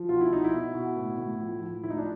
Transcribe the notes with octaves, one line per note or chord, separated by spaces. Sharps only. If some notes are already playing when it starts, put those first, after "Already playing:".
Already playing: F3
B2 F4
E4
B2 D#4
E4
B2
B2
A2
A2
F3
F3
A2 E4
D#4
D4